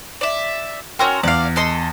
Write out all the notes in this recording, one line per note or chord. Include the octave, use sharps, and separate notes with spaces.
D5 E5
C#4 F#4 A#4 G5 C6 E6
E2 D5 F5
A4 D#5 C6